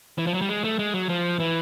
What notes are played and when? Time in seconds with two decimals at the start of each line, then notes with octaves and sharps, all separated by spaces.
0.18 E3
0.27 F3
0.34 F#3
0.41 G3
0.49 G#3
0.64 A3
0.79 G#3
0.94 F#3
1.09 F3
1.40 E3